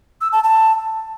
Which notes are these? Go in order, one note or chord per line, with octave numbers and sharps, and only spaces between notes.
E6
A5
A5